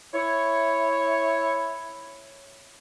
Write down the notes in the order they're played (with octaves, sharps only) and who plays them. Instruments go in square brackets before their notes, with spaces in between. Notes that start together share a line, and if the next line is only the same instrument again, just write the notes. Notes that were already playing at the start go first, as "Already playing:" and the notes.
[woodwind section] E4 C#5